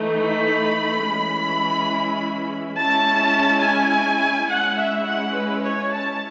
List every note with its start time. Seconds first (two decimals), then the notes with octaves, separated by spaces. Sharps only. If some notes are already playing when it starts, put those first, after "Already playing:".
Already playing: E3 A3 D#4
0.22 B5
1.08 E3 G#3 C#4 E4
2.78 G#3 C#4 E4 A5
3.64 G#5
4.50 G#3 C#4 E4 F#5
4.78 E5
5.07 F#5
5.36 B4
5.65 C#5
5.92 A5